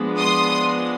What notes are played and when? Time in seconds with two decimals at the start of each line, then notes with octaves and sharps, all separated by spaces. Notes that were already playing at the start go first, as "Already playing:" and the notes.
Already playing: F3 G#3 B3 D4
0.18 C6 D#6